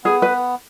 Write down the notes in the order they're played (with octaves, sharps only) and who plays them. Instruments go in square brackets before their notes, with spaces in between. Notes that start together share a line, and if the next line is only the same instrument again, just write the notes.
[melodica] B3 [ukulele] G#4
[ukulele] B4